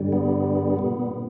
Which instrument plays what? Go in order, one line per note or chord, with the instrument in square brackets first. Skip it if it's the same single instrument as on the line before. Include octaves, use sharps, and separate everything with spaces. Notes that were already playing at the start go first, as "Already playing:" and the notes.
Already playing: [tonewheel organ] G2 D3 G3
B3
A#2